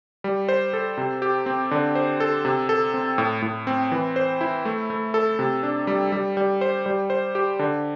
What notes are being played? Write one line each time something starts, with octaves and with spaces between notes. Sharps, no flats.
G3
C5
A4
C3
G4
C4
D3
C5
A4
C3
A4
C4
A2
A2
C4
E3
C5
E4
A3
A3
A4
C3
D4
G3
G3
G3
C5
G3
C5
G4
D3